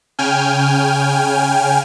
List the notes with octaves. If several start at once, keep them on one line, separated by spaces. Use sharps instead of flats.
C#3 G5 G#5 F6